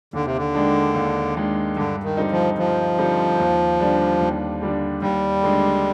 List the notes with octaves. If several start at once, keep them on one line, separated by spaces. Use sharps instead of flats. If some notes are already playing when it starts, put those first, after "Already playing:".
D#2 D3
C3
D3
D#3 G#3 D4
D#2
D#3 G#3 D4
G2 D3
D#3
D3 G3 C4 D#4
F3
G2 F3
D3 G3 C4 D#4
D#2
D3 G3 D4
D#2
D3 G3 D4
D#2 G3
D3 G#3 D4